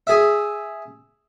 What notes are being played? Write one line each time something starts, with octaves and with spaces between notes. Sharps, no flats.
G#4 E5